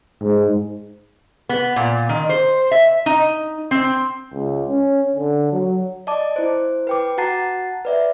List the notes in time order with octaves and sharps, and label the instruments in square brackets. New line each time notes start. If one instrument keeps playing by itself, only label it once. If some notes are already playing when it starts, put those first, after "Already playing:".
[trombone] G#2
[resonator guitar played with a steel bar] B3
A#2
D#3
C5
E5
D#4
C4
[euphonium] C#2
C#4
D3
F#3
[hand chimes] D5 D#5 A5 D6
E4 C5
B4 G5 D6
F#4 F#5 A5 A#5 A6 C7
B4 D5 E5